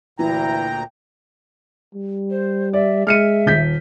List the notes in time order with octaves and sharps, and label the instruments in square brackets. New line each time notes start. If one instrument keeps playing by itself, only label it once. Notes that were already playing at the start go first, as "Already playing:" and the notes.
[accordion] D2 A#2 A#5 [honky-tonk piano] E3 [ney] E4 [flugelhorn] G5
[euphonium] G3
[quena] C5
[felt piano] D5 [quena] E5
[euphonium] G#3 [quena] E5 [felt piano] F6 C#7 D#7
[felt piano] D#1 G6 B6